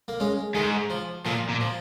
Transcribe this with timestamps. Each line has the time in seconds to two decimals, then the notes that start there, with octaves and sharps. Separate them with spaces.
0.08 A#3
0.20 G#3 C#4
0.55 G#2 D#3 G#3
0.90 F3
1.25 A#2 F3 A#3
1.49 A#2
1.61 F3